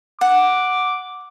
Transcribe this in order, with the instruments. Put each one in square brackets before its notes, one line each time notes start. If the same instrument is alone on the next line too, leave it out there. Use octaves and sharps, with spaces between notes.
[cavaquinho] F#5 [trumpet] D6